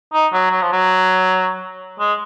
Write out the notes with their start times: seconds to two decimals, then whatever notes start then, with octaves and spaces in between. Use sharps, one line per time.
0.13 D#4
0.33 F#3
0.50 F#3
0.62 F3
0.72 F#3
2.00 G#3